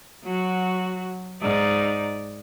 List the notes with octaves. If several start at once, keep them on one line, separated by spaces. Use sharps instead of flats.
F#3 F#4
G#2 D#4 D5